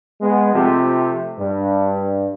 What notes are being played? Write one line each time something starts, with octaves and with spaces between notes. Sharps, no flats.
G#3 B3
C3 F3 A3 C4 G4 A4
G2